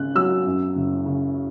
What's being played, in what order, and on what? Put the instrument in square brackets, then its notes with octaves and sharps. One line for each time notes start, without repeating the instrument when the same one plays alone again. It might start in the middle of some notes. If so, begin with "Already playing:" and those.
Already playing: [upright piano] G#1 C#3 F#6
F#3 E6
F#2
F#1
C#3